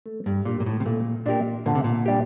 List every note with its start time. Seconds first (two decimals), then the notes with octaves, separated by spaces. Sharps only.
0.06 A3
0.26 G2
0.45 A#2 D4 G4 A#4
0.60 A#2
0.66 A2
0.80 C3
0.86 A#2 A3
1.26 A#2 D4 G4 A#4
1.66 A#2 D3
1.75 C3
1.84 A#2
2.06 G3 D4 G4